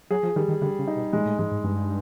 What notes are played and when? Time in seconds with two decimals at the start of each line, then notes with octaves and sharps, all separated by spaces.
0.11 F#3 G#4
0.23 F3
0.36 D#3 G3
0.48 D#3
0.61 D3 G3
0.79 C#3
0.87 D#4
0.96 B2
1.13 A#2 G#3
1.26 A2
1.39 G#2 G#3
1.52 G#2
1.64 G2 G#3